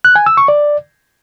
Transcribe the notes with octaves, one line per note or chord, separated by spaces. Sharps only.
F#6
G#5
E6
C#6
D5